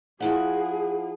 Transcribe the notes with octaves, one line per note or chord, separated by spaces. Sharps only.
F3 E4 G#4 F#5